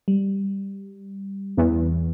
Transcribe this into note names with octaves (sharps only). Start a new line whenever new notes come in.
G3
E2